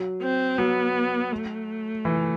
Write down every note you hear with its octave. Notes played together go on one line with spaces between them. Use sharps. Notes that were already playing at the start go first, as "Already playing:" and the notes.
Already playing: F#3
C4
F#3 B3
A3
E3